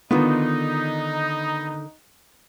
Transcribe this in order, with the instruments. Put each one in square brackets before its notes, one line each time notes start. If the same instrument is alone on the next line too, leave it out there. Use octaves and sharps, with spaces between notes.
[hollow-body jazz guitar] D3 D#3 F4 [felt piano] B3 [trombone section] D#4